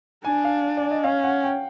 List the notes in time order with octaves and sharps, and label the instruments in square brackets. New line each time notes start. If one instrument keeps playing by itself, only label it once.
[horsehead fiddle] D4 [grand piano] G#5
[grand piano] F5
D5
D#5
[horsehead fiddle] C#4 [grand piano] F5
[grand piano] F#5
G5